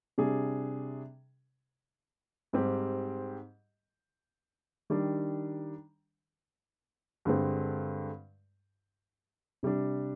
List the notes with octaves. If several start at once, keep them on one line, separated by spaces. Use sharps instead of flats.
C3 G3 D4 G#4
G#2 G3 C4 G4
D#3 G3 D4
G2 D3 G#3 C4
C3 G3 D4